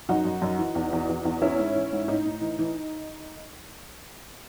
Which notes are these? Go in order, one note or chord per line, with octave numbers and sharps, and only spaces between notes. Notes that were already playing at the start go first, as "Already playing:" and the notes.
F#2 D#4 F#4
F#2
F#2
E3
E2
E2
E2
E2
E3 C#4 E4
G#2
E3
G#2
A2 D#4
A2
E3
E3